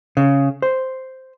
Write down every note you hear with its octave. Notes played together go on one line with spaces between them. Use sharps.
C#3
C5